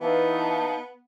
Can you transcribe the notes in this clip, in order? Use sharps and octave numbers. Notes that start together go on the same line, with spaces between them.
E3 B3 D#4 F5 A5